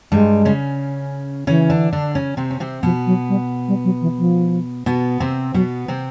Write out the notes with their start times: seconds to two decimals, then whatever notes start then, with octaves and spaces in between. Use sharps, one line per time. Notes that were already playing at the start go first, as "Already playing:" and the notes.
0.12 G2 G3 G#3
0.45 C#3 C#4
1.47 C#3 E3 C#4
1.70 D3 D4
1.93 D3 D4
2.15 C#3 C#4
2.37 C3 C4
2.51 C#4
2.60 C3 C4
2.83 B2 F3 B3
3.06 F#3
3.29 G3
3.68 G3
3.84 F#3
4.01 E3
4.18 F3
4.86 B2 B3
5.20 C3 C4
5.54 B2 F#3 B3
5.88 C3 C4